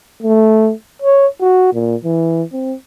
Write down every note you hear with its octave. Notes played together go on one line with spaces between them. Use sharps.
A3
C#5
F#4
A#2
E3
C4